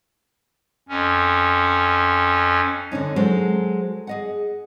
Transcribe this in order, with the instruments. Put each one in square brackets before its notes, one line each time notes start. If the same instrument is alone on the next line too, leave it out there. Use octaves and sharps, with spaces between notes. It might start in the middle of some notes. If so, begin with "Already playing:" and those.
[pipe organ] F2 C#4
[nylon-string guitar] D3 C4 C#4 D#4
F#3 G#3 A4 C5
G#4 D#5 F#5